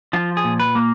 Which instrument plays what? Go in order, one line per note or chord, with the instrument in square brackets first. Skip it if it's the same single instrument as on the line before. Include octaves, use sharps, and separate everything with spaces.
[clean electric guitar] F3 F4
G#4
A#2
B4
A#3